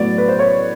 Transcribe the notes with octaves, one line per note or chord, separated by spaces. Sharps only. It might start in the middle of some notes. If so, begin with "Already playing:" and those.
Already playing: A2 F#3 B3 D5
B4
C5
C#5